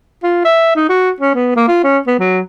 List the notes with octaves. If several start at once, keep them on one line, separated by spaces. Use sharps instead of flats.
F4
E5
D#4
F#4
C#4
B3
A#3
F4
C#4
B3
F#3